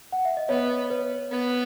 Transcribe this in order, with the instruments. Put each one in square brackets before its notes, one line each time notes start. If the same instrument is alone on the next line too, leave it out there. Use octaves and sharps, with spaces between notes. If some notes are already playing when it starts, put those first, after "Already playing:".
[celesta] F#5
E5
D#5
[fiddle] B3 [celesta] C#5
[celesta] B4
[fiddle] B3